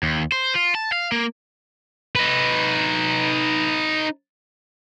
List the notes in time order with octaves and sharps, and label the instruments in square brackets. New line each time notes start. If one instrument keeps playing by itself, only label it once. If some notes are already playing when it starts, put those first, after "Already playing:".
[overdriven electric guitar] D#2
C5
F4
A5
F5
A#3
[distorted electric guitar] D#4 B4